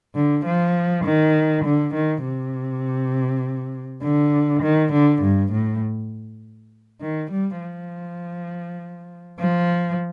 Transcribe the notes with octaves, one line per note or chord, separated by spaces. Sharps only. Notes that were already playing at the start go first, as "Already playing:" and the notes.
D3
F3
D#3
D3
D#3
C3
D3
D#3
D3
G2
A2
D#3
G3
F3
F3